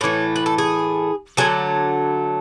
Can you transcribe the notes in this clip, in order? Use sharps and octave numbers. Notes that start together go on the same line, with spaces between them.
A2 E3 A3 C#5
B4
A4
G#4
D3 F#3 A3 G#4